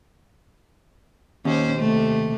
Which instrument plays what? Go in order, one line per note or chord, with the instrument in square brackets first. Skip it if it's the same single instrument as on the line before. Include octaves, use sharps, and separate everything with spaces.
[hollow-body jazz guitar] D#2 [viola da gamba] C#4 C5
[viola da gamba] C3 A3